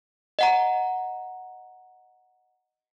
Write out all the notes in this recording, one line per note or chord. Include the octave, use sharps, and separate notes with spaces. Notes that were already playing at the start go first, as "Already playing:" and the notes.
D#5 F#5 A#5